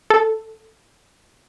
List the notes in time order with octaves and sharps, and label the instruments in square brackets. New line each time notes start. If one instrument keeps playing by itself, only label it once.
[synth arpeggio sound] A4